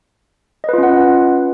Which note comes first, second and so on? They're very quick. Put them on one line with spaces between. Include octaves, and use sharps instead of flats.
D#5 B4 F4 C#4 F#5